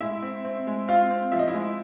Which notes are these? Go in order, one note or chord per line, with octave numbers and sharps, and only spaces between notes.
G#3 E4 E5
C4
C4
G#3
C4 F4 F5
C4
F3 E5
D#5
E4 E5
G#3